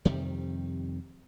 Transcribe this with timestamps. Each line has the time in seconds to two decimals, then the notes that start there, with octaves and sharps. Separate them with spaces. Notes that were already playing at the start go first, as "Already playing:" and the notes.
0.05 F2 C3 D#3 G3